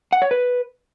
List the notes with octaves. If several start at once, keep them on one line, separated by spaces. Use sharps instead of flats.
F#5
C#5
B4